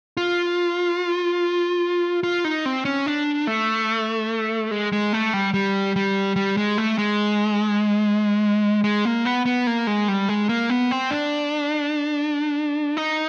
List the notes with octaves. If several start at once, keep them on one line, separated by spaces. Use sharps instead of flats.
F4
F4
D#4
C4
C#4
D4
A3
G#3
G#3
A3
G3
G3
G3
G3
G#3
A3
G#3
G#3
A#3
B3
B3
A#3
G#3
G3
G#3
A#3
B3
C4
D4
D#4